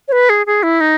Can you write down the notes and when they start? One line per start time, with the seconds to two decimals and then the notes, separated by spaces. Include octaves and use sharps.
0.08 C#5
0.12 B4
0.29 G#4
0.46 G#4
0.63 E4
0.81 D#4